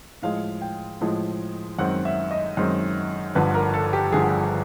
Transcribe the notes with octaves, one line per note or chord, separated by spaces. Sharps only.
A2 F3 G#3 F5
G5
A2 F3 G#3
F#2 D#3 G#3 C4 F#5
E5
D#5
F#2 D#3 G#3 C4
G1 G2 D3 F3 B4
A#4
A4
G4
G1 G2 D3 F3 G#4